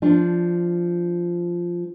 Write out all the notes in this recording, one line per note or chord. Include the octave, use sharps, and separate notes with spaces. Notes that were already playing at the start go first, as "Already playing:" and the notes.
F3 D4